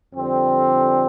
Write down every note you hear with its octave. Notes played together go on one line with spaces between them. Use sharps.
F2 D3 G3 C4